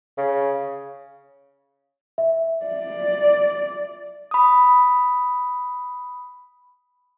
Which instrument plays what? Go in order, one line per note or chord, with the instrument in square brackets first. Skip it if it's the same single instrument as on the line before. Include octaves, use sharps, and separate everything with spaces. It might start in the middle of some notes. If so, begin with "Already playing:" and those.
[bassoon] C#3
[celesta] E5
[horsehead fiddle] D5
[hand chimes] B5 D#6